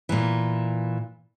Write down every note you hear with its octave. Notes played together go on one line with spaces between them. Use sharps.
A#2 E3